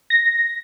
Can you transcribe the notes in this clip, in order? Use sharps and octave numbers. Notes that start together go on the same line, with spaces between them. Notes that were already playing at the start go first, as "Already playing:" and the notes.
A#6